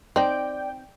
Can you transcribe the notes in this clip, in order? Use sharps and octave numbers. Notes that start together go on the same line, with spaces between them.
C4 D#4 D5 G5